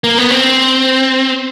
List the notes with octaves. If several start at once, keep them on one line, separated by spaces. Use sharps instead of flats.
A#3
B3
C4